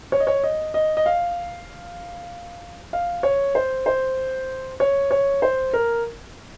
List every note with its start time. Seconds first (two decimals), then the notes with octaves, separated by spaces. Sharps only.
0.12 C#5
0.20 D#5
0.27 C#5
0.44 D#5
0.74 D#5
0.97 D#5
1.06 F5
2.93 F5
3.23 C#5
3.55 C5
3.86 C5
4.80 C#5
5.11 C#5
5.42 C5
5.73 A#4